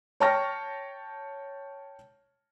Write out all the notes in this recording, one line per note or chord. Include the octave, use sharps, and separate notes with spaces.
C#5 G5 A5 C#6 F6 A#6